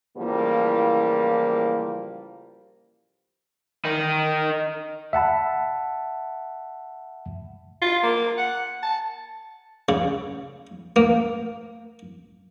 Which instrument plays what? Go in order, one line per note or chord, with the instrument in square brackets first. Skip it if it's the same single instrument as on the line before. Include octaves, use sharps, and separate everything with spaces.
[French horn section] A2 C#3 E3 F3 G3 A#3
[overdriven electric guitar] D#3 D#4
[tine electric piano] E5 F#5 A5 B5
[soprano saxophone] F4
A#3
F#5
A5
[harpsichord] C#3
A#3